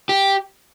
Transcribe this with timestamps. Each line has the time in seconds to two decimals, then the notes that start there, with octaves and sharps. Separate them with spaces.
0.09 G4